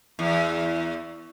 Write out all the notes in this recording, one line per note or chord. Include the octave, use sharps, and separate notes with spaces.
E2